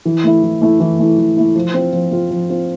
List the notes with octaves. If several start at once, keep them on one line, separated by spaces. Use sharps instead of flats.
E3
A3 E4
E3
A3 E4
E3
A3 E4
E3
A3 E4
F3
C4 F4
F3
C4 F4
F3
C4 F4